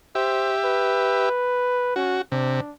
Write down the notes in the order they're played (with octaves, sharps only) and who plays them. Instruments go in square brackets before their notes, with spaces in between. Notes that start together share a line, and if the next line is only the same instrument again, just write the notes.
[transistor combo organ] G4 E5 [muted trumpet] C5
[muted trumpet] B4
[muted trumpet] C#4 [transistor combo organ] F#4
[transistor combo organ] C3 [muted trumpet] D4